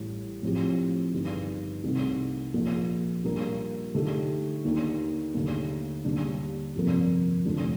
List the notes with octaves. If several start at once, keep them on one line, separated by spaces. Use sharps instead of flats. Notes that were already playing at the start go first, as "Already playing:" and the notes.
Already playing: A1 A2 G3
A2 F3 C4 G4
G1 G2 D#3 G3
C2 C3 D#3 A3
A#1 A#2 F3 A#3
A#2 G3 D4 G4 A#4
D3 A3 D#4 G4
D#2 D#3 A#3 D4
D#2 D3 A3
D#2 D3 G3 D4
G1 F2 C3 F3 A#3
F1 F2 D3 A3 D4